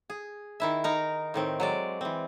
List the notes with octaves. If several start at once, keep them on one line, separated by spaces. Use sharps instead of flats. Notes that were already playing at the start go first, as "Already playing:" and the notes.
G#4
D#3 E4 E5
D#4 A#4
A2 D#3 C4
F#3 G#3 D5
E3 C4